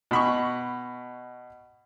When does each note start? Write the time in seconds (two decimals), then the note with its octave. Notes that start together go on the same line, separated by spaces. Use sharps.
0.11 B2 B5 C#6